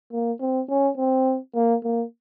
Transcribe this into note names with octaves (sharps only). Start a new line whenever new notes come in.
A#3
C4
C#4
C4
A#3
A#3